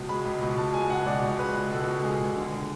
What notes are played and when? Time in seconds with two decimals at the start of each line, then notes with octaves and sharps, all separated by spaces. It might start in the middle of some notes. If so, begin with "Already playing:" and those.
Already playing: C#2 B2
0.09 G#3 B5
0.25 C#2
0.41 B2 B5
0.57 C#2 A5
0.74 G#3 G#5
0.90 C#2 F#5
1.06 B2 D5
1.23 C#2
1.39 G#3 B4
1.56 C#2
1.72 B2 A4
1.88 C#2
2.04 G#3 G#4
2.21 C#2
2.37 D3